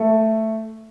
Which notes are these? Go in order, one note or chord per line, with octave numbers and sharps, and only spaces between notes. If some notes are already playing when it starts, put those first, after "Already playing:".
Already playing: A3